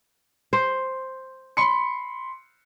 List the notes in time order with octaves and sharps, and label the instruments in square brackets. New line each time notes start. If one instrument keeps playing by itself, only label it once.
[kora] C5
[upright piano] B5 C6 C#7